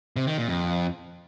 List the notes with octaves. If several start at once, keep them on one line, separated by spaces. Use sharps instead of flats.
C3
D#3
A#2
F2